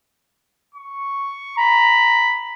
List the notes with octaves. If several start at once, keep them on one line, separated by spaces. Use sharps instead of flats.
C#6
A#5 B5